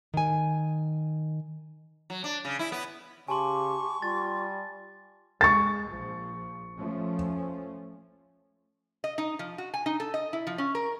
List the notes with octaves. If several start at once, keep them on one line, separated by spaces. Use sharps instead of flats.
D#3 G#5
F#3
D4
C#3
E4
B3
C#3 G4 G#5 A5 C6 C#6
G3 F4 A6
G#3 C#6 A6
A#1 F3
F3 A3 C#4
D#5
D#4
F3
F#4
G#5
D#4
A4
D#5
E4
F3
C#4
A#4